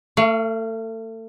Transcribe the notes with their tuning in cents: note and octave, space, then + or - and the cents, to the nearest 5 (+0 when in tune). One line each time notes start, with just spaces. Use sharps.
A3 +30 F5 -20